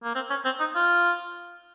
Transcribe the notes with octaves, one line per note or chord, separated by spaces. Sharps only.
A#3
C4
C#4
C4
D#4
F4